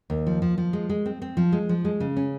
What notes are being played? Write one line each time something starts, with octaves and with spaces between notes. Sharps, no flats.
D#2
F3
F3
F3
G#3
G#3
C4
C4
F3
G#3
F3
G#3
C#3
C#4